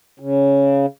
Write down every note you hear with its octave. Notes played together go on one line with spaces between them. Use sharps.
C#3